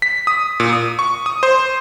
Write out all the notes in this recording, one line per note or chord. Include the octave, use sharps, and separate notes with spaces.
B6
D#6
A#2
D#6
C#6
D#6
C5